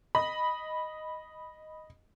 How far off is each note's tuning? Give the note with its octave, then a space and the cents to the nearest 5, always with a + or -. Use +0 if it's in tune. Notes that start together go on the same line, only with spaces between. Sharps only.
D#5 +0 B5 -5